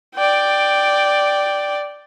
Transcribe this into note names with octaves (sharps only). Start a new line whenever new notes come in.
D5 G5